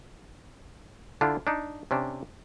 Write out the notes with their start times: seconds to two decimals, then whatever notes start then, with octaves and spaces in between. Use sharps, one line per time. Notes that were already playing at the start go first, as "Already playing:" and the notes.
1.21 D3 D4 E4 F4
1.47 D4 D#4
1.91 C3 C#4 D4